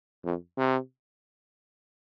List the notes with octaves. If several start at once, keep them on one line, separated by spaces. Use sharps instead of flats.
F2
C3